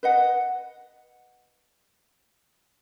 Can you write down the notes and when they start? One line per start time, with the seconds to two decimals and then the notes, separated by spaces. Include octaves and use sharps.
0.03 B4 D#5 F#5